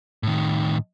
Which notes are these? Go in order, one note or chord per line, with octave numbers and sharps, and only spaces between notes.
A2 D#3